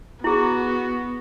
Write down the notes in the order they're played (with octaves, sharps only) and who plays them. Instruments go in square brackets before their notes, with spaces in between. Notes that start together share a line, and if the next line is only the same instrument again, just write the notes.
[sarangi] B3 [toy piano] E4 G#4 [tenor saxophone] F#4